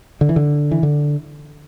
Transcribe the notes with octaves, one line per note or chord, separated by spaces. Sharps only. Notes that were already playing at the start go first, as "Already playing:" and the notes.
D3
E3
D3
E3
D3